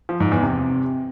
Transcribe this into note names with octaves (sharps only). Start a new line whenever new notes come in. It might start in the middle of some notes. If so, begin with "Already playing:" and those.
F3
G#2
E2
C3